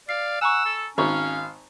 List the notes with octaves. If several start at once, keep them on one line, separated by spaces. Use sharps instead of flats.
D5 F5 C7
F#5 G#5 A#5 C#6 E6
A4
G#1 C#4 F5 A#5 C#6